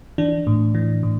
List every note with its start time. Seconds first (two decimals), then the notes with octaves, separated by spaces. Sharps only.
0.18 E3 D4
0.47 A2
0.75 E3
1.03 A2